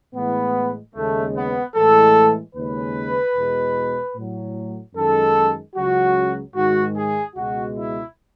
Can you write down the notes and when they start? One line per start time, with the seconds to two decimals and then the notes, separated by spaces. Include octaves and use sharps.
0.14 A2 E3 G#3 B3
0.95 D#2 C#3 G#3 A3
1.35 B3
1.75 A2 E3 G#3 A4
2.54 D#2 C#3 G#3 B4
3.35 E2 B2 G#3
4.16 A2 F#3
4.95 F#2 D#3 G#3 A4
5.75 C#2 C#3 F#3 F#4
6.55 G#2 D#3 G#3 F#4
6.95 G#4
7.36 C#2 B2 G#3 F#4
7.76 E4